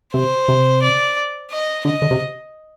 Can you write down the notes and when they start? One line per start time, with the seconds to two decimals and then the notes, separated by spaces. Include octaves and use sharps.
0.14 C3 C5
0.48 C3
0.83 D5
1.51 D#5
1.85 D3 D#5
2.02 D3
2.11 C3